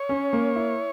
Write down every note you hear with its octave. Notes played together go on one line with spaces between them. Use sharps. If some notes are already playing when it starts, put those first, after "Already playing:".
Already playing: C#5
C#4
A#3
E4